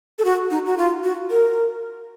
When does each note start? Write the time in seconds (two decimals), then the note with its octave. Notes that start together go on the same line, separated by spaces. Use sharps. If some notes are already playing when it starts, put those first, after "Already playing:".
0.19 A4
0.25 F#4
0.51 D#4
0.66 F#4
0.78 F4
1.04 F#4
1.31 A#4